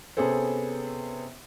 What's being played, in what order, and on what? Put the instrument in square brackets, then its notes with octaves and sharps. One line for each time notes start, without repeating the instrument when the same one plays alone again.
[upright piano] C3 B3 C#4 G#4 A4 C5